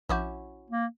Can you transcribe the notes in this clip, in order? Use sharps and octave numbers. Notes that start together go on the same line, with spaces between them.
A#1 C#4 E4 F#4 D6 G6
A#3